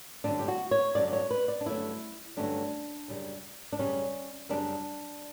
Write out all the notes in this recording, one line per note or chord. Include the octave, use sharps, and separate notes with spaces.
G2 D3 F#3 A3 C#4 D4
G4
F#4
C#5
G2 D3 F#3 A3 C#4 D5
C#5
B4
D5
D4
G2 D3 F#3 A3 C#4 E4
G2 D3 F#3 A3 C#4 D4
F#2 C#3 G3
D4
F#2 C#3 G3 C#4
F#2 C#3 G3 D4